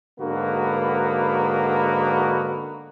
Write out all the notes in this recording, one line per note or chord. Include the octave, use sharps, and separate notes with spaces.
G#2 D3 A#3 B3 F#4